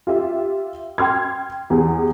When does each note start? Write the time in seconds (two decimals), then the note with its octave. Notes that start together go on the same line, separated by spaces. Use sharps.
0.07 F4 G4 E5
0.98 G5 C6 F6 G#6
1.70 E2 G4 G#4